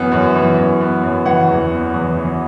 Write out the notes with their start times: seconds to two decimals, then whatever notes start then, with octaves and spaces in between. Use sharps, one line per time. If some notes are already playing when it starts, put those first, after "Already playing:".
Already playing: F#2 E3 B3
0.12 F#2
0.35 E3
0.58 F#2
0.81 B3
1.03 F#2
1.26 E3 F#5
1.48 E2
1.71 B3
1.94 E2
2.17 E3